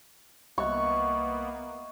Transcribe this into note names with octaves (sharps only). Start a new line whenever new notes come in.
C2 A#3 B3 D#5 E5 C#6 F#6